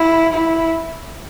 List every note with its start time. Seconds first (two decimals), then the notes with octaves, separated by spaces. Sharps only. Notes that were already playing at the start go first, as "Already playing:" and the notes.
Already playing: E4
0.33 E4